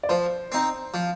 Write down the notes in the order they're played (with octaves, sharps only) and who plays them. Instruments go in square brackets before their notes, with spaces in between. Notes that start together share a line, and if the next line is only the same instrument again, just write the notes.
[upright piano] D5
[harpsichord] F3 [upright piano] C5
[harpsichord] C4 D#4
F3